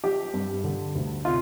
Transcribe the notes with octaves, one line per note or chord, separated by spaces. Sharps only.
F3 G4
G2
D3
D2
C3 F4